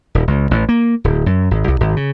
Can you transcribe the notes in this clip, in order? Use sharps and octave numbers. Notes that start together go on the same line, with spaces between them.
D#1
C#2
A1
A#3
D1
F#2
G#1
C2
G#1
C#3